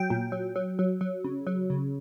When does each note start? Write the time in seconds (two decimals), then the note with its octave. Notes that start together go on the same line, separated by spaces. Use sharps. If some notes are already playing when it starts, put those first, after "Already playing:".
Already playing: F#3 G5
0.10 A#2
0.32 F#3
0.56 F#3
0.79 F#3
1.01 F#3
1.24 C#3
1.47 F#3
1.70 C#3